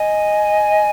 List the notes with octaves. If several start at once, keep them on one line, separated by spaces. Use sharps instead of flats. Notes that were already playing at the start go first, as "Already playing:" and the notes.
Already playing: D#5 G#5